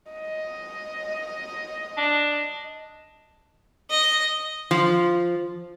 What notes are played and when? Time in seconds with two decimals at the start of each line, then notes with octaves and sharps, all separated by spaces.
0.12 D#5
1.97 D4
3.91 D#5
4.71 F3